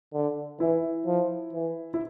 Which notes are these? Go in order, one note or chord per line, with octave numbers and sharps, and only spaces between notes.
D3
E3 E4
F3
E3
E4